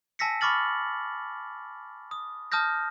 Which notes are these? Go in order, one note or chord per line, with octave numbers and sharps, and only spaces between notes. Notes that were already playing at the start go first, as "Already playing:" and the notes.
G#5 A5 E6 A#6 B6 C#7
B5 C#6 D6 F6 A6 F#7
D#6
A5 D#6 F6 G6 A#6